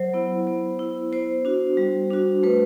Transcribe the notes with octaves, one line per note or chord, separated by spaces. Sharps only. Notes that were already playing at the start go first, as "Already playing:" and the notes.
Already playing: F#3 C5
B3 E4
B3
E4
B3 C5
D4 F#4
G3
D4 F#4
A3 B4